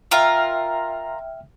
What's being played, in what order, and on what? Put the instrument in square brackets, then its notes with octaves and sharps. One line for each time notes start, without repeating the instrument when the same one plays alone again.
[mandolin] F4 A#4 [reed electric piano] E5 G5 F6